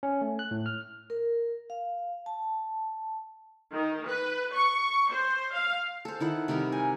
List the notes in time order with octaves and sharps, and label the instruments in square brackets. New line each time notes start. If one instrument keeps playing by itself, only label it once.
[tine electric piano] C#4
A3
F#6
A2
F6
[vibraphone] A#4
F5
A5
[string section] D#3
B4
C#6
C5
F5
[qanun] A4 C5
D#3 E4 F#5
C3 D#3 G3 A#4
G#5